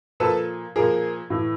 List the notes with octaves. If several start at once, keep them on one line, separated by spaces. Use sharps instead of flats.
A#2 F3 A4 B4
A#2 F3 G#4 A#4
A2 E3